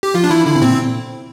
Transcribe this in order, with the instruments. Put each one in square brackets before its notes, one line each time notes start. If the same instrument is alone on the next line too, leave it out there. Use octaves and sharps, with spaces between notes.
[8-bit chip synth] G4
[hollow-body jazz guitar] F3 [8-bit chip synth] F4
[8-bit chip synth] D4
[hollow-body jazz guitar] E3 [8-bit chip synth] E4
[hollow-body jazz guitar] D3 [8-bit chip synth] E4
[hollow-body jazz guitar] C3
[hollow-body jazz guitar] A#2 [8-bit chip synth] C4